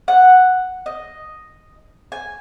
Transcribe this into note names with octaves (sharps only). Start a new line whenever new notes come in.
F#5
D#5
G#5